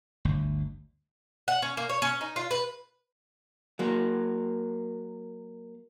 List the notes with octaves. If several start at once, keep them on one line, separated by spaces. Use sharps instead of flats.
G1 D2
F#5
C#4
A#3
C#5
C#4
D#4
F4
B4
F#3 A#3